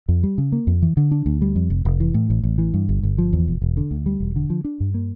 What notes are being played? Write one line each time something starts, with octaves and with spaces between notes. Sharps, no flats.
F2
G3
C#3
A#3
F2
E3
D3
D4
D2
G3
F2
F1
F1
E3
A2
A1
A1
E3
G2
G1
G1
F3
E2
E1
E1
D3
D2
G3
E1
D3
F3
D4
G2
A#3